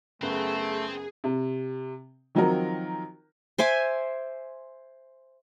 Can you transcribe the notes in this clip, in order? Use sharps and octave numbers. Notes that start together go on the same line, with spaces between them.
F#2 C#3 A3 B3 C4 G#4
C3
D#3 F3 F#3 C4 F#4 A#4
C5 E5 G#5 D6